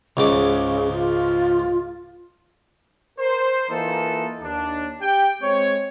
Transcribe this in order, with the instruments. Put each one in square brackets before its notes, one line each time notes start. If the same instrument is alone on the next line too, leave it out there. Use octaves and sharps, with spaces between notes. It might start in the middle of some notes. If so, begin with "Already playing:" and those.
[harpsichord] C#2 G#2 D6 [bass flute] C#3
[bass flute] F4
[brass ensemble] A#4 C5
E3 A#3 D#4 F4 A4
D#2 D4
G4 G5
G#3 C4 C#5